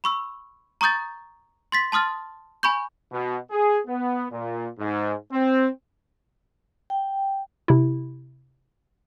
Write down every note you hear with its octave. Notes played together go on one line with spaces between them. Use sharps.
B5 C#6 E6
A#5 C#6 D#6 G6 A6
C6 A6 B6
A5 C6 D#6 F6 A6
G#5 B5 C#6 G6
B2
G#4
B3
A#2
G#2
C4
G5
C3 E4